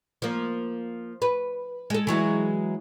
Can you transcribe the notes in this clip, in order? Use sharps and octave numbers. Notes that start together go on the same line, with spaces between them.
F3 A#3
B4
G#3 A4
E3 F#3 G#3